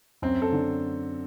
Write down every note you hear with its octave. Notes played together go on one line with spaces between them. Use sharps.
F#2 C4
A4
D3